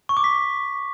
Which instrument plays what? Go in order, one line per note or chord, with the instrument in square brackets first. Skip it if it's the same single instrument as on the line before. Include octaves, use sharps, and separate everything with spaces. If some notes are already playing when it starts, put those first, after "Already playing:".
[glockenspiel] C#6
D6
B6